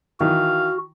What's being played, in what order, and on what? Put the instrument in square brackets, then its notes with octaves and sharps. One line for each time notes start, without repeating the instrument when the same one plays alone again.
[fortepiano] D#3 E3 [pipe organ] F#4 [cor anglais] F5